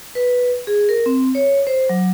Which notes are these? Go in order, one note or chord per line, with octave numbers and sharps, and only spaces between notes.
B4
G#4
A#4
C4
C#5
C5
F#3